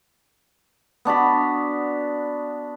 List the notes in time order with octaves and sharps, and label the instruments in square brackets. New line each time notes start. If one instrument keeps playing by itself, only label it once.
[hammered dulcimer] B3 D4 F#4 B5